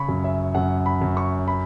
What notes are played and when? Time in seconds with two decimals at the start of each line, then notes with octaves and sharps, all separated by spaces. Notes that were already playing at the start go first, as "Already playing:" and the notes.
Already playing: C#3 B5 C#6
0.09 F#2
0.24 E5
0.55 F#2 F#5
0.86 B5
1.01 F#2
1.17 C#6
1.48 B5